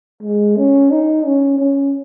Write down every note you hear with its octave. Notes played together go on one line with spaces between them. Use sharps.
G#3
C#4
D#4
C#4
C#4